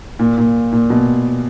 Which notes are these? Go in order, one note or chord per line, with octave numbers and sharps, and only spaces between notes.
A#2
A#2
A#2
B2